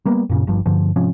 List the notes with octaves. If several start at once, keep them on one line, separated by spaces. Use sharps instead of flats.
G3 A#3 B3
F#2 A#2 C#3
G1 G2 F3
G2 D3 F3
G#2 C3 F3 C#4